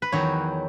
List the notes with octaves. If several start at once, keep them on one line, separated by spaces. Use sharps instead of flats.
B4
E2 D#3 F#3 C#5